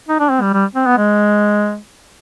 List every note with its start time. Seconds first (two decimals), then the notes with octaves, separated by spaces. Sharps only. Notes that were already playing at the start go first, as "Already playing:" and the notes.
0.08 D#4
0.20 D4
0.31 C4
0.41 G3
0.53 G3
0.75 C4
0.86 B3
0.97 G#3